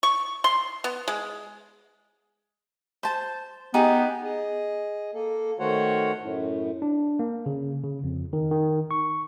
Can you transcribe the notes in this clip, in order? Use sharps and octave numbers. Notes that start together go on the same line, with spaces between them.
C#6
C6
B3
G#3
C5 A5
B3 D#4 G4 G#4
G#4 D#5
A#3 A4
D#3 A3 F#4 C5 C#5 F#5
F#2 A2
D4
A#3
C#3
C#3
F2
D#3
D#3
C#6